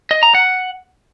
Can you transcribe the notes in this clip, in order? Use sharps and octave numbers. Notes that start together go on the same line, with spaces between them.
D#5
A#5
F#5